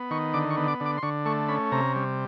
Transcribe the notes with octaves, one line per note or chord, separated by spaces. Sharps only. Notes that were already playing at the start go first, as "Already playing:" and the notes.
Already playing: B3
D#3 C#6
D3 D6
C#6
B3
D6
D3
D6
C6
D3 C#6
A3 C#6
C#4 B5
C3 A#5
G3